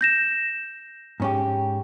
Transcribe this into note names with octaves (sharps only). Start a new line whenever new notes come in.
G6 A#6 E7
G#2 C#4 G4